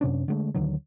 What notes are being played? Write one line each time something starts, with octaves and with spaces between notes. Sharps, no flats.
F#2 C3 C#4 D4
D3 G#3 A3
D2 D3 D#3 F#3